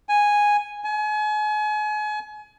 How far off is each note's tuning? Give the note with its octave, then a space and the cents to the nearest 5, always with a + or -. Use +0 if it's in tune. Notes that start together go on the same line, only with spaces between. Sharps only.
G#5 -5
G#5 +35